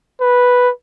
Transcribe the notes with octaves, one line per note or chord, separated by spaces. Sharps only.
B4